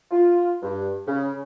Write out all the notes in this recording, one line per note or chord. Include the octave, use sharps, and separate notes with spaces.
F4
G2
C#3